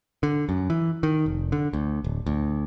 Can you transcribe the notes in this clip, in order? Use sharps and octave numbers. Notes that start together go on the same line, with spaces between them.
D3
F#2
E3
D#3
F1
D3
D2
D1
D2